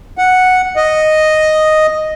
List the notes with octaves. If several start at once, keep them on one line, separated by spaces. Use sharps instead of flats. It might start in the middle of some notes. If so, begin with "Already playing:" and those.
F#5
D#5